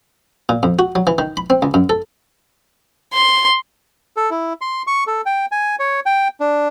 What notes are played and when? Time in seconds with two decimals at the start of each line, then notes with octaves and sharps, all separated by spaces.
0.49 A#2
0.63 F2
0.79 F#4
0.95 F#3
1.07 E3
1.18 D#3
1.37 B5
1.50 C4
1.62 C#2
1.74 F#2
1.89 A4
3.13 C6
4.16 A4
4.31 E4
4.61 C6
4.87 C#6
5.07 A4
5.26 G5
5.52 G#5
5.79 C#5
6.06 G5
6.40 D4